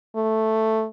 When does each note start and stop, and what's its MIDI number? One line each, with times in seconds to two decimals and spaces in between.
0.16 0.86 57